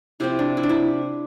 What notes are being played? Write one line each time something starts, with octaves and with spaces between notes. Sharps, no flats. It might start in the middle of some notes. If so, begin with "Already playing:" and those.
C3 F3 C4 E4
D4
E4
D4
E4